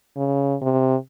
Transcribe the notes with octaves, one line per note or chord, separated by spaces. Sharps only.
C#3
C3